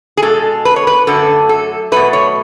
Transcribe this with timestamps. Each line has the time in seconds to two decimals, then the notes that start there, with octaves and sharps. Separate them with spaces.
0.17 G#4
0.22 B2 G#3 A4
0.65 B4
0.76 C#5
0.87 B4
1.07 F#2 D3 F#3 A3 A4
1.49 A4
1.92 B2 F#3 A3 B4
2.13 C#5